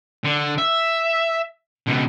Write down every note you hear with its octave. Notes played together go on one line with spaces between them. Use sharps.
D3
E5
C#2 B2